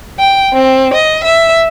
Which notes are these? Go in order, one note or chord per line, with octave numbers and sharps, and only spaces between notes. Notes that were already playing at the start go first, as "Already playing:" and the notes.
G5
C4
D#5
E5